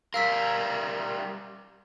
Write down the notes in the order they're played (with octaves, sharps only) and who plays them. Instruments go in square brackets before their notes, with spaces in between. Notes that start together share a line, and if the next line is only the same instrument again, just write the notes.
[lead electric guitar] G3 A#4 [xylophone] F5 E6 B6